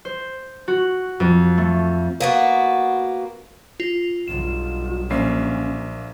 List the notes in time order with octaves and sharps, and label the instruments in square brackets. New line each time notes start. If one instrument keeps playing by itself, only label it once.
[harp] C5
F#4
F2
A3
[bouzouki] A#3 B3 F#4
[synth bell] F4
[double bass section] B1 G2 [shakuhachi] F4 [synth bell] E7
[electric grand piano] A#1 A#3 C7 [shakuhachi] C#4